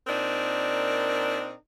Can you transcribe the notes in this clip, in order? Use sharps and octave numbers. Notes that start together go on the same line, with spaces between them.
A#2 C4 D4 D#4 A#4